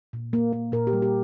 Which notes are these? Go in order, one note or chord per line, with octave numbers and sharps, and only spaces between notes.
A#2
A#3
A#3
A#2 A#4
G4
G3
G4